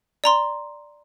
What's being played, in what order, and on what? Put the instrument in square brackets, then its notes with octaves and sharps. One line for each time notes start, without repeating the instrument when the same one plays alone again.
[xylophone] D5 A#5 C6